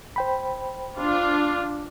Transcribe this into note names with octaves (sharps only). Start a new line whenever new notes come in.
C5 G5 B5
D4 F4